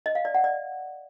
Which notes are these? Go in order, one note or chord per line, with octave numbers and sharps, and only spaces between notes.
D#5
F5
D5
F#5
D5